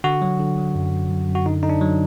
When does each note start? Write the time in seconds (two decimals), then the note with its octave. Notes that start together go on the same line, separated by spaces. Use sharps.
0.04 D3 F#4
0.22 F#3
0.39 D3
0.58 F#3
0.75 F#2
0.92 F#2
1.10 F#2
1.28 F#2
1.35 F#4
1.46 D3 D#4
1.63 D3 D#4
1.69 D4
1.81 F#3